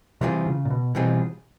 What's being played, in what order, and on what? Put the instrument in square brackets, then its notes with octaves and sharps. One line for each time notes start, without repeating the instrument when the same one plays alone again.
[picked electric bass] C3 [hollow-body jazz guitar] E3 G3 C4 F4 G#4
[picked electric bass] C#3
A#2
B2
[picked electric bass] B2 [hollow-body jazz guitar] E3 G3 C4 F4 G#4